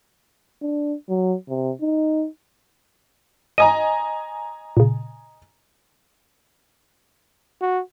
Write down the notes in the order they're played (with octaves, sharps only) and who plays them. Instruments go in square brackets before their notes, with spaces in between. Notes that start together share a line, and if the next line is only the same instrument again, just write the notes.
[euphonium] D4
F#3
C3
D#4
[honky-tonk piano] D#5 G#5 A#5 [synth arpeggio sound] D#6 D#7
[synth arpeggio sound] A#2 C#3
[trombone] F#4